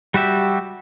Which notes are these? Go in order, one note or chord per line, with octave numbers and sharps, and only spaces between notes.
G3 F#4 G4 E5